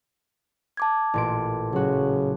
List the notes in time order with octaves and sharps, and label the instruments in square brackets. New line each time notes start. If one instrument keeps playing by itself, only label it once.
[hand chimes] A5 D6 G#6
[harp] A1 A#2 D7
[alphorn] C#3 [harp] F#3 F#4